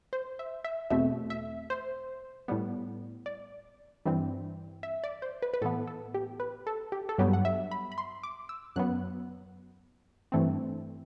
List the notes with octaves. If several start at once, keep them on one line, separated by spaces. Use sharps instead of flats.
C5
E5
E5
E2 B2 A3 C4 E5
E5
C5
A2 G3 B3
D5
G2 E3 G3 C4
E5
D5
C5
B4
B4
A2 E3 B3 A4
A4
G4
B4
A4
G4
A4
G2 F#3 B3 G4
F#5
E5
B5
B5
C6
D6
E6
F#2 F#3 B3 F#6
G2 E3 A3 C4